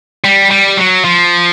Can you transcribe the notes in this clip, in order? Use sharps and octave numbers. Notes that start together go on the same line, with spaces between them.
G3
G3
F#3
F3